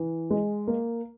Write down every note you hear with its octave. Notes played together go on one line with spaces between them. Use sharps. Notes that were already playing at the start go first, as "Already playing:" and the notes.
Already playing: E3
G#3
A#3